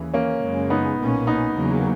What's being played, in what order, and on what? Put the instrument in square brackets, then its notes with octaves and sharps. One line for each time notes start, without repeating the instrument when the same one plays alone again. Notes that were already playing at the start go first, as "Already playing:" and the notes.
Already playing: [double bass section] D#2 C#3 E3
[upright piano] A#3 C#4
[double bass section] F#2 C#3 G#3
[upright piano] B3 D#4
[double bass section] B1 A#2 A#3 C#4
[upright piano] B3 D#4
[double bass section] E2 C#3 F#3 A#3